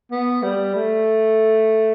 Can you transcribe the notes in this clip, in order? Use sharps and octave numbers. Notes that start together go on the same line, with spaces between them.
B3
G3
A3